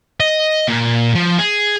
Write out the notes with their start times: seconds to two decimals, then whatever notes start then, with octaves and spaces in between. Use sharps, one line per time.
0.20 D#5
0.68 A#2
1.15 F3
1.39 G#4